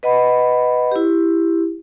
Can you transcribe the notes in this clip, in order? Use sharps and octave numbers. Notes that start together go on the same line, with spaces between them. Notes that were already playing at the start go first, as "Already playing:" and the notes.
B4 D#5 F#5 B5
E4 G4